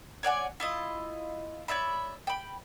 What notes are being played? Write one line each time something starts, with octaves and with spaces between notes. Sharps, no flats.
C#5 D5 F#5 G#5
E4 F4 D#5
C#5 D5 E5 B5
G5 B5